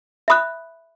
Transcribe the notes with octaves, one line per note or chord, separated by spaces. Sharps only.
E5 B5 D#6 F#6